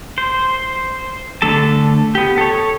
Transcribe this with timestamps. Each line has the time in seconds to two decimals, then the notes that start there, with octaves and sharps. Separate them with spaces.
0.18 C5
1.42 D3 A3 A4 A5
2.15 B3 G4
2.38 A4 C#5